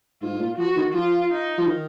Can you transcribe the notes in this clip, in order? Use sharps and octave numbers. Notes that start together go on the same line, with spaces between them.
G#2 F4
G#2
A#2
F3 F#4
D#3
F3 F4
D#4
F3
D#3